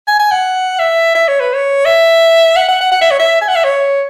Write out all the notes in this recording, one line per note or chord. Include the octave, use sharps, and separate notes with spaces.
G#5
G#5
F#5
E5
E5
C#5
B4
C#5
E5
F#5
F#5
F#5
F#5
E5
C#5
E5
G#5
F#5
E5
C#5